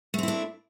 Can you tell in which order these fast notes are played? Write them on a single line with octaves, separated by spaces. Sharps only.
A3 C4 E4 D4